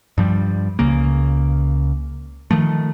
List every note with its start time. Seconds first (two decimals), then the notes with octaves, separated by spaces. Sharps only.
0.18 G2 F3 G3
0.79 C#2 C#3 A#3
2.51 D#3 F3 A3